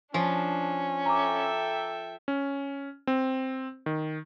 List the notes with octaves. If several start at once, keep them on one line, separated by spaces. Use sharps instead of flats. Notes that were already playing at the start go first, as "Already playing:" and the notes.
F3 C#4 D4
A4 E5 G5 A#5 D6
C#4
C4
D#3